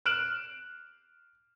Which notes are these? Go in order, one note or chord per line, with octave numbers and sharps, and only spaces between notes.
F6 F#6 D7 E7 F#7